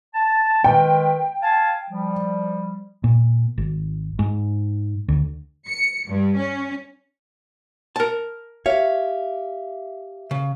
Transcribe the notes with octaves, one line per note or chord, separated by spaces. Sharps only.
A5
D#3 G#3 B4 G5
F5 G#5 A5
F3 G3
A#2
G#1
G#2
D2
C#7
G2
C#4
A#4 A5
G4 C#5 E5 F5
C#3